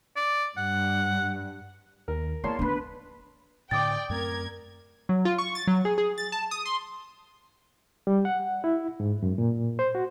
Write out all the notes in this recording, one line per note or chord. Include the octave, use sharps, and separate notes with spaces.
D5
G2 F#5
D#2 A#4
E2 A#3 C#5 D5 A5 C6
D3 D#3 B3 B4
A2 D3 D5 G5 D6 D#6 A6
F#2 A3 C4 A#4 G#6
F#3
F4
C#6
A6
F#3
G#4
G#4
A6
A5
D#6
C6
G3
F#5
E4
G#2
F#2
A#2
C5
F#4